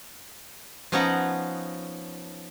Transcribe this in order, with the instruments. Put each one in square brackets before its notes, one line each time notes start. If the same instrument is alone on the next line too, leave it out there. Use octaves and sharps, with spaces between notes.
[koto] F3 B3 C#4 D#4 F#5 A#5